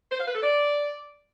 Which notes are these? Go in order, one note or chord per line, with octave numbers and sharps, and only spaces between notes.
C5
F5
B4
A4
D5